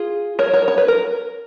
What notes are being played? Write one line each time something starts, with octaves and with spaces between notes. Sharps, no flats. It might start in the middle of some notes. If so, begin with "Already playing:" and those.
Already playing: F4 G#4
A#4 C#5
A#4 C#5
C#5
B4
A#4